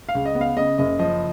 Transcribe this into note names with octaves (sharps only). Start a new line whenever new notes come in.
F5
C#2
D#5
B3
F5
C#3 D#5
F#1 D#5
F3 D#5